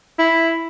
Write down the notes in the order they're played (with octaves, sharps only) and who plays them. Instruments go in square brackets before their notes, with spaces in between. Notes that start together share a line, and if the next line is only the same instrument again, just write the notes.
[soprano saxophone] E4